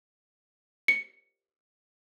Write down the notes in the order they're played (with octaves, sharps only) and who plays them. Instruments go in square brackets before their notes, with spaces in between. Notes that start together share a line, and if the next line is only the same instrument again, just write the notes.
[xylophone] C#7